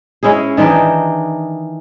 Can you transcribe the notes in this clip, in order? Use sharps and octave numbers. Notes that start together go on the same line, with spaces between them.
G#3 C#4 E4 G#4
D#3 E3 D4 D#4